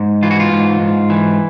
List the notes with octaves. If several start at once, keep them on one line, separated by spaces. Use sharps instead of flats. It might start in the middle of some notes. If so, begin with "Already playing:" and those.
Already playing: G#2
E3 F4
F#4
F4
G#2
G#2
E3